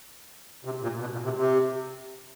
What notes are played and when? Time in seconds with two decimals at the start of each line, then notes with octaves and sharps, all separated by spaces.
0.65 C3
0.82 A#2
1.00 B2
1.12 A#2
1.24 C3
1.36 C3